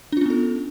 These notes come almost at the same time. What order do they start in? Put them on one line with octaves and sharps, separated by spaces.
D4 F4 C#4 B3 A4